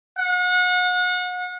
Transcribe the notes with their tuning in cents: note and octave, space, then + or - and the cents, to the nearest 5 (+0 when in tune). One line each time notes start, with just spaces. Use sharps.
F#5 -35